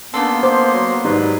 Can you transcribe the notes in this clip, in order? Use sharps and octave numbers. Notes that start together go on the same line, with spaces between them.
C#3 A#3 B3 D4 A4 C6
C5 D6
F#3
G#2 F#3 G3 D#4 B4